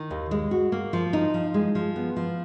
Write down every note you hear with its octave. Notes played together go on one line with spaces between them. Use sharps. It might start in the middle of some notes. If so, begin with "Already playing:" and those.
Already playing: D#3
D#2
G#3
F#4
A#3
F3
D#4
F3
G#3
F3
B3
F3